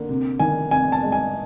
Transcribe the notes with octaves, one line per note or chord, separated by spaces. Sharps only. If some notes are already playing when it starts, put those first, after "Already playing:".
Already playing: D3 A#3
C3
D#3 G#5
C3 G#5
A5
G#3
G#5